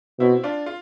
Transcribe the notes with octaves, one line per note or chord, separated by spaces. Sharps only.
B2 C4 E4
D4 F4
F4